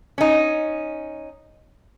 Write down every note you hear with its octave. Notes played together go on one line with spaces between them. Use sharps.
C#4 D#4